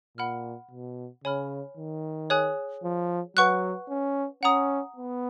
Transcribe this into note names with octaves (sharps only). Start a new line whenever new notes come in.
A#2 F#5 B5 F6
B2
C#3 C#5 G#5 B5 F6
D#3
G#4 C#5 G#5 D#6 F#6
F3
F#3 B4 F#5 C#6 F#6
C#4
C#4 F#5 A#5 D#6
B3